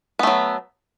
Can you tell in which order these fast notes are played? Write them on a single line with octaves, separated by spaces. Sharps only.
B3 A3 F#3